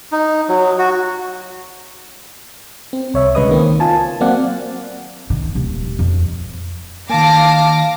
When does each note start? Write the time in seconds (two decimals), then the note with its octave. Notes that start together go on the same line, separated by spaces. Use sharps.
0.12 D#4
0.49 F#3
0.78 F#4
2.93 C4
3.14 C2 C#5 E5
3.35 C2 C#3 G#3 B4 D#5 D#6
3.49 D#3 A#3 C4
3.80 F4 G#5 A5
4.21 F#3 A#3 C4 D5 F5 F#5
5.30 D#3
5.55 D#1
5.99 F2
7.10 D#3 A#3 F5 A5 D6 A#6